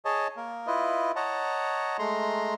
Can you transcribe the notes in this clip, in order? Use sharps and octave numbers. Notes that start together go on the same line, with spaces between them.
G#4 C#5 D#5 A5
A#3 A#4
E4 F4 B4 D#5
C#5 D#5 F#5 A5 A#5
G#3 A3 A#5 C6